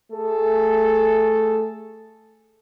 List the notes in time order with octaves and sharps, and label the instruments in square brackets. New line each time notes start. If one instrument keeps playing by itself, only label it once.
[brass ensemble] A3 G#4 A4